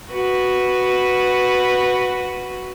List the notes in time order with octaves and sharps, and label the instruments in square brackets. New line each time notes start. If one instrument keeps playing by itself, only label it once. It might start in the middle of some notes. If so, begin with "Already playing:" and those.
[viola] F#4 B4